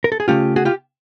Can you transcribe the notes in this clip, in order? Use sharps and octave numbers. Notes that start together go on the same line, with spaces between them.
A#4
A4
G#4
C#3 F3 A3 C#4 F4 G4
F#4 G#4
F4 G4